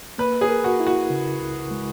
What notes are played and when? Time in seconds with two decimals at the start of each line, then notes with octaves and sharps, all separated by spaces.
0.18 A#3 B4
0.41 G#4
0.49 A#4
0.64 F#4
0.80 E4
0.87 F#4
1.10 C#3
1.40 C#2
1.71 G#3